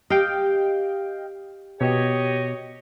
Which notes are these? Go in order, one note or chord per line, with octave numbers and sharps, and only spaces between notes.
G4 D#5 F5 G5
B2 G4 C#5 D#5